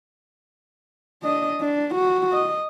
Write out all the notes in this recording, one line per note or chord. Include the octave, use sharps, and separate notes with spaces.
D4 D#5
D4
F#4
D#5